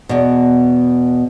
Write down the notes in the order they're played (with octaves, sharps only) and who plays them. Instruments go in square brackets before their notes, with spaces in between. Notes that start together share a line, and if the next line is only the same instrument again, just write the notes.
[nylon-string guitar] E2 B2